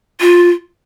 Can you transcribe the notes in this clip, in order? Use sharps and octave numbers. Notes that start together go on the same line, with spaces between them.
F4